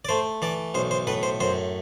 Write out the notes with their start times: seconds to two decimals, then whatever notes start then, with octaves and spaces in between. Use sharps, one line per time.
0.05 D5
0.09 A3 C5
0.42 E3 D5
0.74 B1 C5
0.91 C5
1.07 A2 B4
1.23 C5
1.40 F#2 C5